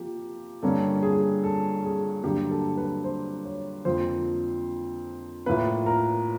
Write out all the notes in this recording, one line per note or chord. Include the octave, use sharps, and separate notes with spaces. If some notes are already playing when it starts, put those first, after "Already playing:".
Already playing: F3 A#3 G4
G2 D3 G3 A#3 C#4 A4
G#4
A4
G#4
G2 D3 F#3 A#3 G4
A4
B4
C5
C#5
F2 D3 F3 A#3 C5
A2 F3 A#3 C#4 B4
A#4